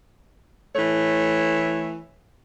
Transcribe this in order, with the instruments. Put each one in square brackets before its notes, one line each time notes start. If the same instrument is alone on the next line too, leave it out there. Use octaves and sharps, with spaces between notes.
[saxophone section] E3 A3 C#5